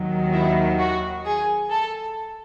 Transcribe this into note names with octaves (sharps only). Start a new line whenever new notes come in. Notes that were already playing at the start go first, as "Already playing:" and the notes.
Already playing: D#2 D#3 F#3
E4
F#4
G#4
A4